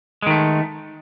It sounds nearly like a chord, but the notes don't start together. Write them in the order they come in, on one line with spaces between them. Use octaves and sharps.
G#3 D#3 A3